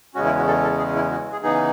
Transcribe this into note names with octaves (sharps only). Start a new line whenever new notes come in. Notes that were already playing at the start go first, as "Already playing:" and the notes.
E2 C#3 G#3 C#4 F#4
E4
F#4
A4
A4
G#4
E4
F#4
G#4
C#3 E3 B3 D#4 G#4